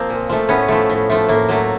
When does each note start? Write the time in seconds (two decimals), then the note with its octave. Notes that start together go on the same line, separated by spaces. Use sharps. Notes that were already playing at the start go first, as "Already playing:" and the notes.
Already playing: F3 A#3 C4
0.10 A#2
0.29 F3 A3
0.49 A2 B3 C#4
0.68 F3 A3
0.89 A2
1.10 F3 A3
1.28 A2 A#3
1.49 F#3 A3